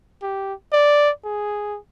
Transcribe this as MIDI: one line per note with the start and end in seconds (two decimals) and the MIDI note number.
0.22 0.53 67
0.72 1.11 74
1.24 1.79 68